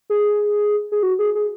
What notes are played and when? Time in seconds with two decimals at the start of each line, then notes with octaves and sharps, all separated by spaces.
0.10 G#4
0.92 G#4
1.03 F#4
1.19 G#4
1.35 G#4